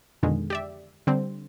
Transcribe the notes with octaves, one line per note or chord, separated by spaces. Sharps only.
F2 B2 D3 D#3 G#3
G4 D5 E5
D3 G3 C4